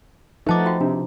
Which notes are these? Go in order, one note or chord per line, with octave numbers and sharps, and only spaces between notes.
F3 A3 D#4 B4 F#5 A5 D6 A6
F4 F#4 G5
C3 D4